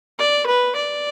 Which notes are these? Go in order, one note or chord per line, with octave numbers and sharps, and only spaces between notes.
D5
B4
D5